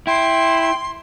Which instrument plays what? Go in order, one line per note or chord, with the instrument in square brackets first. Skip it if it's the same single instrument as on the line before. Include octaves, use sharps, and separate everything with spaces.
[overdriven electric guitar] E4 [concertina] G5 [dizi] C6